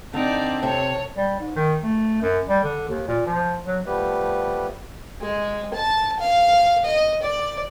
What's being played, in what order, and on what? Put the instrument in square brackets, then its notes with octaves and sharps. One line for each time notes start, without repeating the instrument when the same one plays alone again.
[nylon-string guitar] D3 [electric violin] C4 [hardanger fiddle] D#4 D5
[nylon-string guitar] C3 E5 [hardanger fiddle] A4 C#5
[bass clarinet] G3
G#2
D#3
A3
F#2
G3
D3
D#2
A#2
F3
F#3
[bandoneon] F3 G3 A3 B3 G4 B4
[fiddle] G#3
A5
F5
D#5
D5